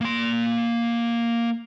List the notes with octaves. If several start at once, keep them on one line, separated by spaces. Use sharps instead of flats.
A#3 C6